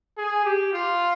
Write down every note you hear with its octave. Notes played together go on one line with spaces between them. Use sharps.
G#4
G4
F4